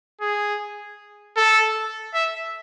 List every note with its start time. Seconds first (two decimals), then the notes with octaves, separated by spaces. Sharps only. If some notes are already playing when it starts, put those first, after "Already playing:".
0.21 G#4
1.37 A4
2.14 E5